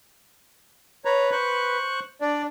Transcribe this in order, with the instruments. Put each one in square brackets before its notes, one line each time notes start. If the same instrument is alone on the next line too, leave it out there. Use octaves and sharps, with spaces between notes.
[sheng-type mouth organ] B4 [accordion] C#5 A#5
[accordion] C5 C#6 F#6
[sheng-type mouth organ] D4 [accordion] D5